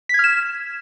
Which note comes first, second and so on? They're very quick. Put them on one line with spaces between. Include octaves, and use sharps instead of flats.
B6 G#6 F6 E7